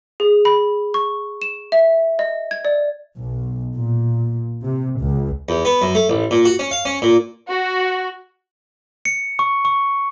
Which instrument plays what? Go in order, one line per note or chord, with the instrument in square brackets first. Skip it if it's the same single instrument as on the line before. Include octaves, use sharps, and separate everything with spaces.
[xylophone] G#4
B5
C#6
E7
E5
D#5
G#6
D5
[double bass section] B1
A#2
C3
C#2
[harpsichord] E2
B3
F#2
A3
A1
A#2
F#4
C#4
F5
C#4
A#2
[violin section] F#4
[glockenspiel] C#7
C#6
C#6